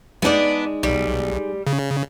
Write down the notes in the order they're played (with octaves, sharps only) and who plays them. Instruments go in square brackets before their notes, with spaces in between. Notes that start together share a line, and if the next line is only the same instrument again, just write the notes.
[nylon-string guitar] G#3 D#4 D5 [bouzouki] B3 D4
[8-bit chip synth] B1 [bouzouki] G3
[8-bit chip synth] C#3